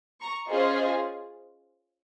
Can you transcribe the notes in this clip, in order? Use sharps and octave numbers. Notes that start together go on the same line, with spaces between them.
A#5 C#6
C#4 F4 G#4 C5 D#5